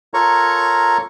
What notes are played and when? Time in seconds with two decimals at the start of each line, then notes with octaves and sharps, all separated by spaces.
0.14 F4 A4 A#4 C#5 A#5 C#6